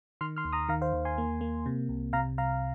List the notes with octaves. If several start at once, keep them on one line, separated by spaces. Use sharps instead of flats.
D#3 C6 F6
C6 F6
D#2
A#5 D#6
D#3 F5 A#5
C5 F5
D#2
G#5 C6
A#3
A#3
C3
C2
C3 F5 A#5
C2 F5 A#5